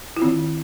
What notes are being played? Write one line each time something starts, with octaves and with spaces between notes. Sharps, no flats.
D#3 C4 E4 F4